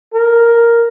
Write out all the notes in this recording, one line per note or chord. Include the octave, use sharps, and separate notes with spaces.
A#4